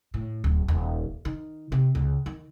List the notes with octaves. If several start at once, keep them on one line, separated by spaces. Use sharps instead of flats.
A2
D1
D#1
D#3
C3
C#2
D#3